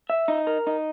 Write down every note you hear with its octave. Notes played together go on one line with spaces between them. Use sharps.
E5
D#4
A#4
D#4